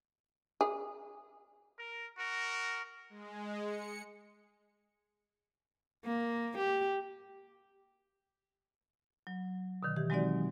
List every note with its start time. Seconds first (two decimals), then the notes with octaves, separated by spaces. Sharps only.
0.61 G#4
1.77 A#4
2.18 F#4 A#4
3.10 G#3
3.64 C#7
6.05 A#3
6.57 G4
9.27 F#3
9.83 B2 D3 D#3
9.96 E3 G4
10.10 F#3 G#3 C4 D#4 F#4 D5